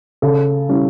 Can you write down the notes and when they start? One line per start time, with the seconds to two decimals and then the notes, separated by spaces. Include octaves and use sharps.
0.22 C#3 A4
0.69 G3 C#4 E4